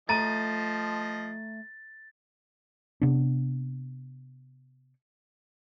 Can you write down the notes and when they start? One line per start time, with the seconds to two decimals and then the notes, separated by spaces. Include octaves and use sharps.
0.09 F3 A3 D#5 A#5 A6 D#7
3.02 C3 B3 D4